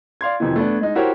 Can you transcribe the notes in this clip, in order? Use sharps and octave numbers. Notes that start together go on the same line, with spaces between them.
D5 F5 C6 G#6
F2 C3 D#3 E3
A3 B3 D4
G#3 D#4
E4 F#4 G4 A#4 C5 C#5